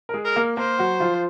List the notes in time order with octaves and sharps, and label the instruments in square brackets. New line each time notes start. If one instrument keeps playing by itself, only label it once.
[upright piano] A#4
G#3 G#4
[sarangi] A#4
[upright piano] A#3 A#4
[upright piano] A#3 A#4 [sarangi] C5
[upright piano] F#3 F#4
F3 F4